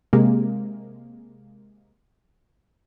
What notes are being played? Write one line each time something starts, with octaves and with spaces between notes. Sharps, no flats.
C3 G#3 A#3